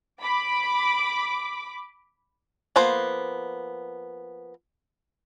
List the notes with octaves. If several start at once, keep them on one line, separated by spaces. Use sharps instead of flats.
B5 D6
F3 A#3 B3 C5